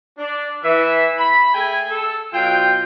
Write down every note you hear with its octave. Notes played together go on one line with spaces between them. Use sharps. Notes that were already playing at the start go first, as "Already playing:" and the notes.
D4
E3 E5
B5
A3 G#4 G5 G#5
A4
B2 F#3 F4 G5